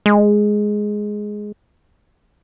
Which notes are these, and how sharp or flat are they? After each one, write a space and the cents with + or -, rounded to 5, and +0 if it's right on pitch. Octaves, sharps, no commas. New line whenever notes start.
G#3 +5